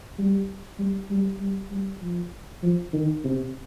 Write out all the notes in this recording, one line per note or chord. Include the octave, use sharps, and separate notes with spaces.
G3
G3
G3
G3
G3
F3
F3
D#3
C3